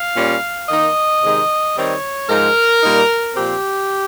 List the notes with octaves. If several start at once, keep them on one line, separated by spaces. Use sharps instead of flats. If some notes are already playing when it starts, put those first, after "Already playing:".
Already playing: F5
A#2 G3 C#4
D#3 A#3 D#4 D#5
C3 D#3 G#3 D#4
D#3 G3 C4 D#4 C#5
G#2 F3 G#3 A#4
A#2 G3 A#3 D#4
A#2 F3 C4 G4